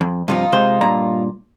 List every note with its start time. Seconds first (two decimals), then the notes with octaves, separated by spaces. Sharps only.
0.01 F2
0.28 G2 C3 F3 A#3 D#4 F4
0.52 C3 G#3 C5
0.81 G2 A#2 A#5